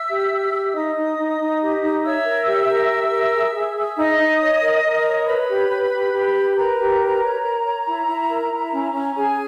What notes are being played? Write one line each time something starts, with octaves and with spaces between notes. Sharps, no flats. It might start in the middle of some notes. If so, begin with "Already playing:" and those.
Already playing: E5 E6
G4
G4
G4
D#4 D#5 D#6
D#4
D#4
D#4
G4
D#4
C#5 E5 E6
A#4
G4
A#4
G4
A#4
G#4
G#4
G#4
D#4 D#5 D#6
D#4
C#5
A#4
A#4
C#5
B4 C#5 B5
G4
G4
G4
G4
B4
A#4 B4 A#5
G4
B4
C#5
A#4
C#5
E4
E4
A#4
E4
C#4
C#4
C#4 G#4 G#5